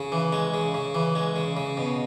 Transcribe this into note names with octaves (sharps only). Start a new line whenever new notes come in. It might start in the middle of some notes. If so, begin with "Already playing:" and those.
Already playing: C#3
E3
G#3
C#3
C#3
E3
G#3
C#3
C#3
B2